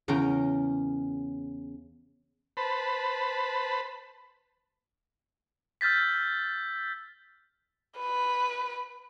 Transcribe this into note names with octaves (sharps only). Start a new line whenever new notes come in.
E2 C#3 C#4 A#4 G5 A#5
B4 C5 A5 B5
E6 F6 G6 A6 B6
B4